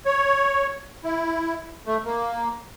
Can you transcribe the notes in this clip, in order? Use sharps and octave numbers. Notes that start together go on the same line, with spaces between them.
C#5
E4
A3
A#3